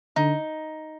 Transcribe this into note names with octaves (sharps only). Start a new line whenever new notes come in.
D3 D#4